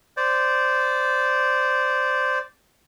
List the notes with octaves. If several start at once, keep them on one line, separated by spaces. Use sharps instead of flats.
C5 D5